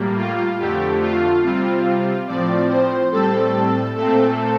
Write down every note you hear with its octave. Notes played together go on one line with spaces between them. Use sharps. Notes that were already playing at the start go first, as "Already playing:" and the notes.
Already playing: A2 G3 A#3
F4
F2 D3 A3 G4
F4
C3 G3 C4 F4
A2 F3 C4 D5
C5
A2 G3 C4 A4
A#2 A3 C4 A4